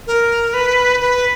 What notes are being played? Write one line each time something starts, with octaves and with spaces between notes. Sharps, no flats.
A#4
B4
B4